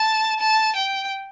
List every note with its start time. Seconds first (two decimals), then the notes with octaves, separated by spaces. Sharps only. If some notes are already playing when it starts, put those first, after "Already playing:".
Already playing: A5
0.40 A5
0.76 G5